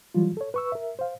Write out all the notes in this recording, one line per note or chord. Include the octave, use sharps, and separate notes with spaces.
E3 F#3 G3 F4
A4 C#5
B4 C#6 E6
A#4 E5
C5 F5